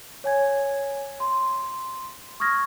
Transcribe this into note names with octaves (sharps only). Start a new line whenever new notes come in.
C#5 G#5 G#6
C6
C#6 D#6 F6 G#6 A#6